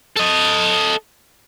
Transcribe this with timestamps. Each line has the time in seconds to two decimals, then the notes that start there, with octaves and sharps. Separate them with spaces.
0.17 A4 D#5